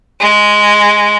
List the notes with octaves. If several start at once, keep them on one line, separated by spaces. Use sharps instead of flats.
G#3